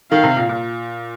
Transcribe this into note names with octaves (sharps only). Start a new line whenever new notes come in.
D#3 F5
C3
A#2
A#2